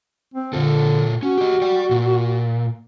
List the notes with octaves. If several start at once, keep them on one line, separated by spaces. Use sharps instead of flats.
C4
A#2 D3 F4 A4
C#4 F#4
G4 D#5
D5 G5
A#2